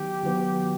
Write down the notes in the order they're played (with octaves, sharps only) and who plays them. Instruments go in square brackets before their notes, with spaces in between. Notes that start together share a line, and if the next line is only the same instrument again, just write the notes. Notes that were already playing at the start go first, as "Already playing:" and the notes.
Already playing: [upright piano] D#3 F#3 B3 [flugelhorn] G4
[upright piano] D#3 F#3 B3